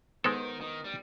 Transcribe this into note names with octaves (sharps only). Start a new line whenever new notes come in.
D#3 G#3 B3 D#4 A4 C5
D#3
G3